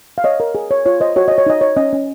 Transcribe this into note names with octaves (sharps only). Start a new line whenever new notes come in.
F5
C#5 D#5
A#4
G#4
C#5
F4 C#5
C5 D#5
F#4 C#5
C#5 D#5
C#5
D#4 D#5
C#5
C#4 D#5
C#4